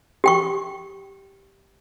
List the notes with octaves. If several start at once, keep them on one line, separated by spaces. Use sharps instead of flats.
G4 G5 C#6